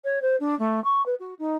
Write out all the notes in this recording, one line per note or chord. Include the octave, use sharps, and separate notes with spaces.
C#5
C5
D4
A3
C#6
B4
F#4
D#4